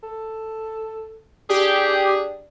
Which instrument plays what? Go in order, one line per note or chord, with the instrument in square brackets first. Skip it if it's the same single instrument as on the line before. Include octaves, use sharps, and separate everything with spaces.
[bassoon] A4
[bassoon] D4 [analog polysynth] G4 [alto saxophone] G#4